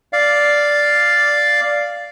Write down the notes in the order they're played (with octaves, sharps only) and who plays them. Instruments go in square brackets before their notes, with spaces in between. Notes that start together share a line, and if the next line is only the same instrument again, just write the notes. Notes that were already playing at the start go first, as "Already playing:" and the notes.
[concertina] D5 F5